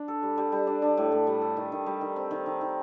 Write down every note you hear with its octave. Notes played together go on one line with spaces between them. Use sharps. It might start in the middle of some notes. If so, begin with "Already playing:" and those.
Already playing: D4
A4
G3
G3
G3
D4
D4
A2
A2
G3
A4
D#3
D#3
G3
D#3
C4
D#3
D#3
D#3